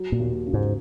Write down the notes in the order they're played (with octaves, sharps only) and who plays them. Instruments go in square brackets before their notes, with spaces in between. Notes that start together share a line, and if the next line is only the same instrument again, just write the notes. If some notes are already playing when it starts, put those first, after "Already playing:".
Already playing: [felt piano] F#3
[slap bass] A#2
[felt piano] D#2
C#3
[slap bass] G#2